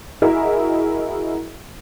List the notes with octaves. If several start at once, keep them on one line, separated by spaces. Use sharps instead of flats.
E4 F#4 G#4 A#4 D#5 E5